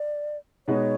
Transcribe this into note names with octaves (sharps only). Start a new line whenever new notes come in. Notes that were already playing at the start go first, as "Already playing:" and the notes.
Already playing: D5
B2 G#3 B3 D#4 C#5